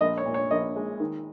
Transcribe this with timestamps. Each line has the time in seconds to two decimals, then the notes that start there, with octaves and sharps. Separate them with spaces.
0.01 A#1 D#5
0.18 C#5
0.26 A#2
0.34 C#5
0.51 A#1 D#5
0.76 G#3
1.00 D#3